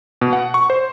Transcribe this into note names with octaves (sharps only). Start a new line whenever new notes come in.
B2
F#5
C#6
C5